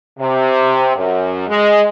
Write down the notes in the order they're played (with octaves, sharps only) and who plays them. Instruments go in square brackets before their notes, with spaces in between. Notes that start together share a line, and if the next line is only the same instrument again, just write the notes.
[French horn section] C3
F#2
G#3